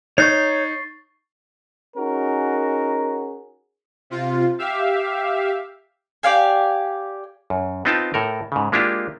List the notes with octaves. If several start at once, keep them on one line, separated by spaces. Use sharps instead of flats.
D#4 C#5 C#6 F#6 G6 A6 C7
C#4 D#4 F#4 G#4 A#4
C3 F4
G4 E5 F5
G4 D5 F5 G#5
F#2
B3 C4 D#4 F4 G5 A5
A2 A4 A#4
G#2 C#3
G#3 A#3 D4 E4 F4 G4